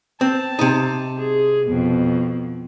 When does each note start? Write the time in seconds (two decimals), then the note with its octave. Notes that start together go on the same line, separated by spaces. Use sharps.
0.21 C4 A5
0.59 C3 D#4
1.19 G#4
1.66 F2 B2